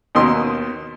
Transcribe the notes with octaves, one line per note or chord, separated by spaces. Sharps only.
D#2 B2 D#3 C6 D#6